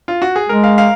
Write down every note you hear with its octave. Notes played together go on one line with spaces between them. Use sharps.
F4
F#4
G#4
G#3 A#4
F5
F5